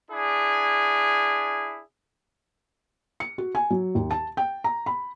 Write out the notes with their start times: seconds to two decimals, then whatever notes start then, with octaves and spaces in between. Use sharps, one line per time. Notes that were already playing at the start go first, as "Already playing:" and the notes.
0.11 D4 E4 G#4
3.20 C#7
3.38 F#4
3.55 G#5
3.70 F#3
3.95 D#2
4.11 A5
4.37 G5
4.64 A#5
4.86 B5